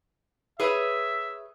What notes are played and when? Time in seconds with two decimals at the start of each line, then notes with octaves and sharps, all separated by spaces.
0.60 G#4 B4 C#5 E5